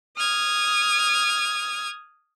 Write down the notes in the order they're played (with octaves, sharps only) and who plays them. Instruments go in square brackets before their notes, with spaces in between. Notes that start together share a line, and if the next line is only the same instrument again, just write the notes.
[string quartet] D#6 F6 G#6